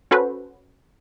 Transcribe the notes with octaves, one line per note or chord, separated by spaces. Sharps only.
C#4 F#4 A4 B4 C5